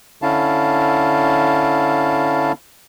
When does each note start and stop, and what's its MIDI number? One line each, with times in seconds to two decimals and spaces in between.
0.22 2.52 50
0.22 2.52 61
0.22 2.52 64
0.22 2.52 77
0.22 2.52 81